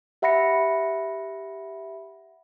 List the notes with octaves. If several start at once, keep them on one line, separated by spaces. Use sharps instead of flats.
G4 E5 F#5 B5 A#6 C#7